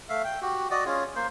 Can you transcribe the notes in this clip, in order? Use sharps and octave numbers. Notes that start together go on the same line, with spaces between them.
A3 E5 F5
G5
F#4 G4
F#4 D5 D#5
C#4 F4 G#4
A#3 C5